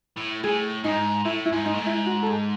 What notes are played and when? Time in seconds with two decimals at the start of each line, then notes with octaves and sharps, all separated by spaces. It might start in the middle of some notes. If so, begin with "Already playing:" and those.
0.17 A2
0.43 A2 G#4
0.84 G#2 D#4
1.25 A2 E4
1.45 E4
1.52 G#2
1.66 D#4
1.74 A2
1.79 G#2
1.86 E4
2.06 F#4
2.23 A4
2.27 G#4